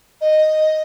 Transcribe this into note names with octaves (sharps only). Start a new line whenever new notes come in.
D#5